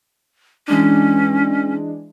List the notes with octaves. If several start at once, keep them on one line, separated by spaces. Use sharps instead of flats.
E3 G#3 C#4 D4